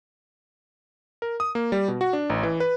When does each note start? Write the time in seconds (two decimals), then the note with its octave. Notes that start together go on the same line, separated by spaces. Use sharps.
1.22 A#4
1.40 D#6
1.55 A#3
1.72 G3
1.88 B2
2.01 F#4
2.13 D4
2.30 A1
2.43 E3
2.60 B4